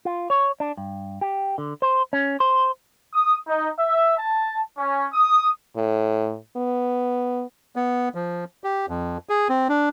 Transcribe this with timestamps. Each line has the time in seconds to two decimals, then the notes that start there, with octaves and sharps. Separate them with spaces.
0.05 F4
0.30 C#5
0.60 D4
0.77 G2
1.21 G4
1.58 D3
1.82 C5
2.13 C#4
2.40 C5
3.13 D#6
3.48 D#4
3.77 E5
4.18 A5
4.78 C#4
5.13 D#6
5.76 A2
6.57 B3
7.76 B3
8.15 F3
8.64 G4
8.89 F2
9.29 G#4
9.49 C4
9.69 D4